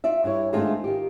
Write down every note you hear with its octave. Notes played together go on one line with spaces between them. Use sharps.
F4 D5 E5
G2 E4 C#5
D#3 G#3 A3 C4 D4 F4
D#3 F4 G4